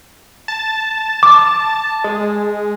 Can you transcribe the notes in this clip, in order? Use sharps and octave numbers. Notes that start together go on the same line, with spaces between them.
A5
D6
G#3